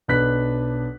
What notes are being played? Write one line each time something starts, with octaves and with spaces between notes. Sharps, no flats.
B1 D4 B4 F#6 B6